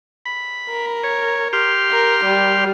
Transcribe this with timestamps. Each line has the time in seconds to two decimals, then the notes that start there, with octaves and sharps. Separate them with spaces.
0.26 B5
0.70 A#4
1.04 C#5
1.53 G4 C6 F6
1.92 A#4
2.25 G3